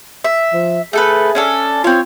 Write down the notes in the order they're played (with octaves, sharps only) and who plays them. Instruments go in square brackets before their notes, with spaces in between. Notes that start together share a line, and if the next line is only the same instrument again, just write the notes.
[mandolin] E5
[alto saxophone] F3
[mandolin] A3 A4 B4 [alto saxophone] G#4
[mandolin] C#4 D4 A4
[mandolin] C4 C#5 [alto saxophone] F4